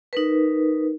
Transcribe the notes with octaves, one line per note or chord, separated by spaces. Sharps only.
D#4 A#4 B4